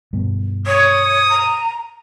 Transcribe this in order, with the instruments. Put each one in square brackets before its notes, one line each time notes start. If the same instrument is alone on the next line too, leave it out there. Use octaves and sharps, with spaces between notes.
[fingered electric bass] G2 B2
[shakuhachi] C#5 [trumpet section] D#6
[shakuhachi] A#5